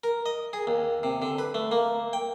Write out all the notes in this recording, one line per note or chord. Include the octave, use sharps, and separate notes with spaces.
A#4
D#5
G#4
D#2
C3
D3
B4
A3
A#3
G5